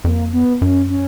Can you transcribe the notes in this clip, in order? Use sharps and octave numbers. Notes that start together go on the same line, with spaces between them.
F2 A#3
B3
F#2 C#4
C#4